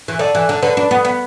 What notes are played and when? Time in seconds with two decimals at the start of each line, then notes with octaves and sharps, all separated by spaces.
0.08 E3
0.19 D3 A4 D5
0.35 E3
0.49 D3
0.62 D3 B4
0.77 D4
0.91 B3
1.05 B3